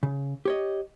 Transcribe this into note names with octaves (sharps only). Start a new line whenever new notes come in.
C#3
G4 C#5 D#5